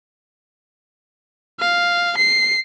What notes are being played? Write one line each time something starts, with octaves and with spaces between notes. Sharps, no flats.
F5
C7